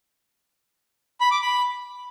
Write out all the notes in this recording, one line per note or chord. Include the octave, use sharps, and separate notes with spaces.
B5
D6
B5